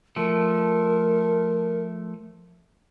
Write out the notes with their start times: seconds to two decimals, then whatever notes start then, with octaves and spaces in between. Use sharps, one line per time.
0.16 F3 A3 A#4